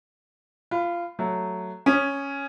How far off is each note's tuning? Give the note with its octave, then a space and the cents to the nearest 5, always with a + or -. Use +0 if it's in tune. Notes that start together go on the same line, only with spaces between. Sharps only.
F4 -15 B5 +25
F#3 +0 A3 +5
C#4 +0 D#6 -25